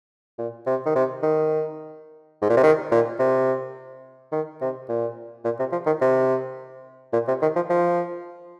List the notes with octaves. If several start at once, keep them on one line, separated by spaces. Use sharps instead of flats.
A#2
C3
D#3
C3
D#3
G#2
A#2
C3
D#3
A#2
C3
D#3
C3
A#2
A#2
C3
F3
D#3
C3
A#2
C3
D#3
F3
F3